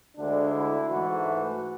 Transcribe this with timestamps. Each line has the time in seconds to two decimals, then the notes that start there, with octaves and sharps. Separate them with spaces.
0.17 D2 D3 G#3 D4
0.53 E4
0.89 G#2 E3 A3 F#4